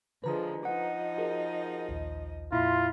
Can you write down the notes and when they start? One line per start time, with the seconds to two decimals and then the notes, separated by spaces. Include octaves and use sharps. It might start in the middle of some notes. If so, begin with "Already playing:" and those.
0.24 D3 F3 G#3 B4 A#5 D#6
0.65 F3 D#4 D#5 F#5
1.18 F#4 G#4 A#4
1.89 A#1 D#2
2.52 F2 A#2 E4 F4 E5 C6